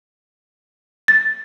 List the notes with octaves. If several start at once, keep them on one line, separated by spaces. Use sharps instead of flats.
A6